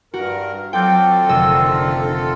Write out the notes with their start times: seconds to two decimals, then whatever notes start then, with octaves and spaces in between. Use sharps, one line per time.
0.14 G2 F#4 A#4
0.73 F#3 C4 F4 A4 G5 D6 G6
1.29 F1 D3 D#3 D#5 E6